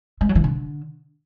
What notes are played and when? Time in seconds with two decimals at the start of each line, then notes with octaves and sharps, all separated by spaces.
0.21 G#3
0.29 F#3
0.35 E3
0.44 D3